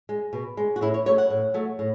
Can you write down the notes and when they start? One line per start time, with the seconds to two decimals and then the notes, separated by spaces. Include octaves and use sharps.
0.09 G#3
0.33 B2
0.57 G#3
0.76 F#4
0.81 A2 E4
0.94 C#5
1.06 F#3 A3 C#5
1.18 F#5
1.30 A2
1.54 F#3 A3
1.79 A2